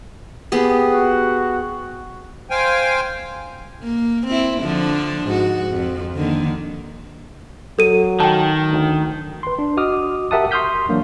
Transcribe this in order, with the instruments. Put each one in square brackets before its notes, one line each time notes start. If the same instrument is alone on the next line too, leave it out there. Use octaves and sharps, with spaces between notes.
[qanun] B3 G4 G#4
[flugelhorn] F#4
[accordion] C5 F5 G5 G#5
[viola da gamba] A#3
C4 E4
D3 F3 D4
G#2 F#4
F2
D3 D#3 A#3
[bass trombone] F#3 [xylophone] A4 D#7
[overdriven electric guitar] D#3 [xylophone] G5 A5
[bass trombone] D2
[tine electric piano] B4 C6
D4
F#4 D#5 D6 D#6 F6
G4 A#4 E5 F#5 A5 D#6
C6 C#6 D#6 F6 G6 B6
E3 F#3 A#3 D4